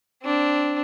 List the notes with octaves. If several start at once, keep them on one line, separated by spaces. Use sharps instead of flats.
C4 D4